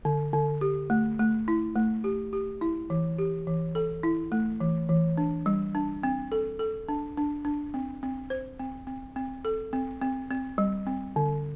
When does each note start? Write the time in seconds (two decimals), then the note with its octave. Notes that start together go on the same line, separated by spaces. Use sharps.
0.05 D3
0.33 D3
0.61 G4
0.90 A3
1.19 A3
1.48 E4
1.76 A3
2.04 G4
2.33 G4
2.61 E4
2.90 E3
3.18 G4
3.47 E3
3.75 A4
4.03 E4
4.32 A3
4.60 E3
4.89 E3
5.18 D4
5.46 G3
5.75 D4
6.03 C4
6.32 A4
6.59 A4
6.89 D4
7.17 D4
7.45 D4
7.74 C4
8.03 C4
8.30 C5
8.59 C4
8.87 C4
9.16 C4
9.45 A4
9.73 C4
10.02 C4
10.31 C4
10.58 G3
10.87 C4
11.16 D3